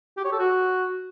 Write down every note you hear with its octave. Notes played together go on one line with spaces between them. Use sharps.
G4
C#5
A4
F#4